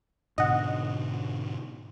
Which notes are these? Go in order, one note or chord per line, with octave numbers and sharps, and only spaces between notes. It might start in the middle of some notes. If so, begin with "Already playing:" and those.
G#2 B2 D3 D#5 F#5